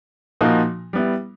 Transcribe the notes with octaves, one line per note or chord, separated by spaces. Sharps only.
A#2 F3 A#3 D#4 F#4
G3 B3 E4